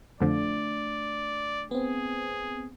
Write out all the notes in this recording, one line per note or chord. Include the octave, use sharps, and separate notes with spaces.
F2 D3 F3 A3 D4 D5
B3 C4 G#4